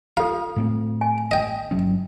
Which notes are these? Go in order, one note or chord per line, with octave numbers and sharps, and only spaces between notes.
F4 A4 F5
A2 A3 C4
G#5
D#5 G5
G1 F#3 C#4